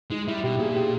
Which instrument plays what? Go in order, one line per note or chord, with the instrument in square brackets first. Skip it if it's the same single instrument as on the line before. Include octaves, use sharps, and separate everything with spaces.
[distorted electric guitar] G#3 [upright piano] D#4
[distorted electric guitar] G3 [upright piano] E4
[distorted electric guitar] B2 [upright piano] G4
[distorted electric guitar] A#2 [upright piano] G#4
[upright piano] G4